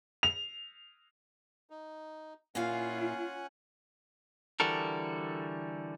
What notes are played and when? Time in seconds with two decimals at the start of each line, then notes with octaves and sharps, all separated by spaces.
0.23 F7
1.70 D#4
2.55 A#2 C#4 E4 F4 F5 F#5 G#5
4.60 D3 E3 G3 F#4 A4 A#4